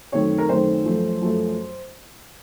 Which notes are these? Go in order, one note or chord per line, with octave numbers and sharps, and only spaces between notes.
F#2 D#3 A3 C4 C#5
A#4
F#2 D#3 A3 C4 C5
F#2 F3 A3
F#2 F3 A3